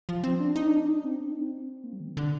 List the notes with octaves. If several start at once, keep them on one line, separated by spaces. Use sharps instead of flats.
F3
C4
D4
D#4
D4
D#4
D4
C4
D4
D#4
C4
A#3
G3
D#3
D3